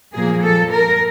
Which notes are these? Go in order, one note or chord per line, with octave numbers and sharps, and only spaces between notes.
A#2 F3 A#3 G#4
A4
A#4